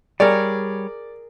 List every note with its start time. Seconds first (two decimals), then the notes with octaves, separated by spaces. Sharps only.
0.20 G3 G#4 A#4 C#5 D5